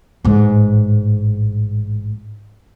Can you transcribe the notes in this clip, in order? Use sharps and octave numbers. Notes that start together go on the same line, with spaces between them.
A1 G#2